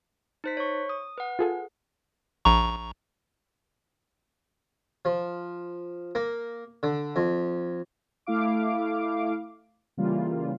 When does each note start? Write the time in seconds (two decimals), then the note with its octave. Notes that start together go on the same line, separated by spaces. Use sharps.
0.44 D#4 C5 B6
0.57 C#5 C#6
0.89 D#6
1.18 B4 F#5
1.39 F4 G#4 A4
2.45 A#1 A#5 C#6
5.05 F3
6.15 A#3
6.83 D3
7.16 F2
8.26 A3 E4 F5 D6
9.97 C#3 E3 G3 A#3 F4